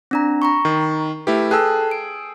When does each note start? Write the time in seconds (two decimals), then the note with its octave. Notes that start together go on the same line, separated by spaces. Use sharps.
0.11 C4 D4 A#5
0.42 A#5 B5 C#6
0.65 D#3
1.27 A3 E4 G4 B4
1.51 G#4 A4 G5 A5 E6 F#6
1.91 D7